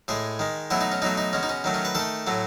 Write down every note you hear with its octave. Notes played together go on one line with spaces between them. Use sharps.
A2 G#3 G#4
D#3 G#3
B2 F#3 A3 E4
D#4
C#4
B2 F#3 A3 D#4
D#4
B2 G#3 C#4
D#4
C#4
D#3 F#3 A3
C#4
B4
D#3 A3 A4
A2 F#3 A3